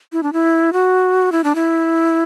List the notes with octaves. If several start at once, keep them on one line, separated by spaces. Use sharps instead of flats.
E4
D4
E4
F#4
E4
D4
E4